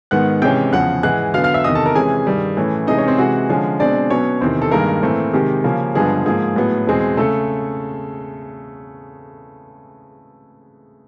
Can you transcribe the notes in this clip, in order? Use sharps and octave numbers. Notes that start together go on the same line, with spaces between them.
G#2 D#3 G#3 B3 F#5 F#6
C3 E3 G#3 C#4 G5 G6
E2 C#3 F3 F#5 F#6
G#2 E3 G#3 F#5 F#6
D3 F#3 B3 F5 F6
F5 F6
E5 E6
E2 C3 D#3 D#5 D#6
A4 A5
A#4 A#5
C3 E3 G#3 C#4 G#4 G#5
G2 D#3 G3
A2 E3 A3 C#4
C3 E3 G#3 D#4 D#5
C#4 C#5
C4 C5
C3 E3 G#3 F#4 F#5
D3 F3 G#3 C#4
B2 G#3 C4 D4 D5
B2 F#3 B3 C#4 C#5
E2 C3 D#3 C4 C5
A4
G2 D#3 G#3 A#3 A#4
A2 E3 A3 C4
C3 D#3 G#3 G4
C#3 F3 A#3 C#4
G2 D3 F3 G#3 B3 G#4
G#2 F3 A#3 G#4
A2 F#3 B3
E2 B2 G#3 C4
C#3 A3 A4